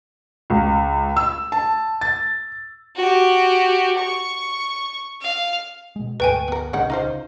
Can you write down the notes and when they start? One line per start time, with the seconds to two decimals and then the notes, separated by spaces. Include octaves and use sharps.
0.50 C#2
1.17 E6
1.52 A5
2.01 A6
2.96 F#4 G4
3.98 C#6
5.21 F5
5.96 B2 G#3
6.20 D2 G#2 A3 B4 G5 G#5
6.48 B3 A#4
6.73 D#1 C2 C#3 G#3 D#4 F#5
6.90 D#4 F4 C5